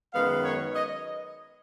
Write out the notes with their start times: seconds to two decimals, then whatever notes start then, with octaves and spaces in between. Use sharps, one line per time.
0.13 F#2 D#3 G#3 B3 F5
0.44 C#5
0.74 D#5